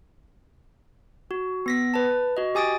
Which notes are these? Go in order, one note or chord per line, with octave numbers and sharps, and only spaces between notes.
F#4
B3 A#6 B6
B4 A5
F#4 D#5
G4 G#5 D#6 A6 D7